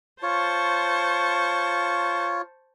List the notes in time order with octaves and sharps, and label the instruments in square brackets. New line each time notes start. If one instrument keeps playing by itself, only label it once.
[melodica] F4 C#5 [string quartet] C5 A5 C#6